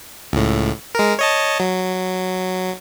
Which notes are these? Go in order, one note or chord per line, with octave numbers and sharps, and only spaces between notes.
C#2 A2
G#3 A#4
C#5 D#5 A5
F#3